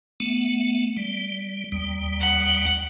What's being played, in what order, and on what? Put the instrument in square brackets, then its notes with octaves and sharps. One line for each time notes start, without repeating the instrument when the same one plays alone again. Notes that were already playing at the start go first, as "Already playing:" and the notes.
[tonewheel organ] A3 B3
G3
D#2 G3
[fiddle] F#5